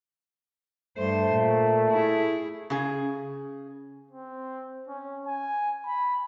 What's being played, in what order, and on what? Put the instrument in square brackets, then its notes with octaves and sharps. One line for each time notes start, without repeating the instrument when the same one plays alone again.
[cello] G2 C5 [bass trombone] A3
[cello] A#2
E4 G#4
[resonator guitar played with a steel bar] C#3 G#4
[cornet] C4
C#4
G#5
B5